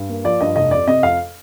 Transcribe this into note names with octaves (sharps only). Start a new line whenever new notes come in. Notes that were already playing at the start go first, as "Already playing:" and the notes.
Already playing: G2
A#3
F3 D5
G2 D#5
F1 D#5
F2 D5
C3 D#5
F2 F5